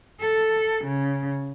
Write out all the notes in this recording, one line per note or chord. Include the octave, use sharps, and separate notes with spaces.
A4
C#3